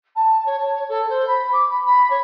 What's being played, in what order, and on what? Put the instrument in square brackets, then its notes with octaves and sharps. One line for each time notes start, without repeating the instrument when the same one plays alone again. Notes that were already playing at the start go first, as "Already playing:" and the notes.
[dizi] A5
C#5
A5
C#5
A4
C5
B5
D6
B5
B5
C#5